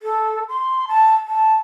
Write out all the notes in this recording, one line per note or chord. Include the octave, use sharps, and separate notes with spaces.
A4
C6
A5
A5